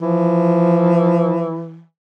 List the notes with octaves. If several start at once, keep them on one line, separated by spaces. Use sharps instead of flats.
E3 F3